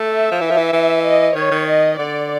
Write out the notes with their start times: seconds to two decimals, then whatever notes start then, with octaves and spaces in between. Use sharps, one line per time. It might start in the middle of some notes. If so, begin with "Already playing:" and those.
Already playing: A3
0.10 E5
0.32 F3
0.41 E3
0.50 F3
0.57 E3
0.73 E3
1.04 D#5
1.35 D#3 C#5
1.51 D#3
1.67 D#5
1.98 D3 D5